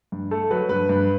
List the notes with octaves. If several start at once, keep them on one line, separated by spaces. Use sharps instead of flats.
G2
A3 A4
F#3 B4
G2 B4
G2